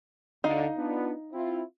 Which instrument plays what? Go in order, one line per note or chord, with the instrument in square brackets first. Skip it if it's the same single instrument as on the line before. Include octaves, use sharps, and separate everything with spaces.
[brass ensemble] D2 D3 [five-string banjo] D#4 D#5 F5
[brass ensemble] B3 D4 F4
C4 E4 F4